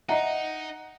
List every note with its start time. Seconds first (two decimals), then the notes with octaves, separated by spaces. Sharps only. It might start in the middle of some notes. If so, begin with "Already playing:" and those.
0.09 D#4 D#5 E5 F#5 A#5